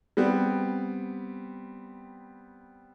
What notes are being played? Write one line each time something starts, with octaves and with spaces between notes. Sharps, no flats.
G3 B3 C4